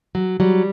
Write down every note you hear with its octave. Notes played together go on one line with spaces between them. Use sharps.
F#3
F#3 G3